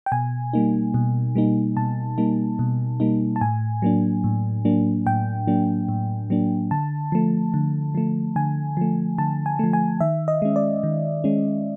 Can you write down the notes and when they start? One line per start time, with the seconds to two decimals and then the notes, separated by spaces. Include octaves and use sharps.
0.06 G5
0.12 B2 G#5
0.53 G3 A#3 D#4
0.94 B2
1.35 G3 A#3 D#4
1.76 B2 A5
2.18 G3 A#3 D#4
2.59 B2
3.00 G3 A#3 D#4
3.36 A5
3.41 A2 G#5
3.82 F#3 A#3 D4
4.24 A2
4.65 F#3 A#3 D4
5.06 A2 G5
5.47 F#3 A#3 D4
5.89 A2
6.30 F#3 A#3 D4
6.71 D3 A5
7.12 F3 A3
7.54 D3
7.95 F3 A3
8.36 D3 G#5
8.77 F3 A3
9.18 D3 A5
9.46 G#5
9.59 F3 A3
9.73 G#5
10.01 D#3 E5
10.28 D#5
10.42 G#3 C#4
10.56 D5
10.83 D#3
11.24 G#3 C#4